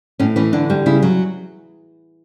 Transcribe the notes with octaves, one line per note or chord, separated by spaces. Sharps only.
A2 C#4
E3 C#4
D3 D4
G3
C#3 E4
F#3